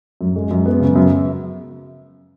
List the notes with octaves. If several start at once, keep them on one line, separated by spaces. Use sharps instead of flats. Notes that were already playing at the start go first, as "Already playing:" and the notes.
F#2
G#3
F#2
B3
C#3
F#2